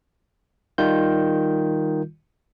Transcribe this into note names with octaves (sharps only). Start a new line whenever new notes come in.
D#3 G3 F4 G6